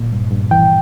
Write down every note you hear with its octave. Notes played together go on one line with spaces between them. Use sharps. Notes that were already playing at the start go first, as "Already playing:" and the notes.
Already playing: A#2
G2
G2
E3 G5